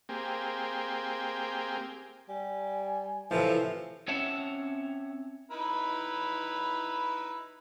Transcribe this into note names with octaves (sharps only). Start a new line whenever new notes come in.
A#3 C4 G4 G#4
G3 G#5
A2 C3 E3 F3
C4 C#4 C#5 E5 F#5 A5
D#4 E4 B4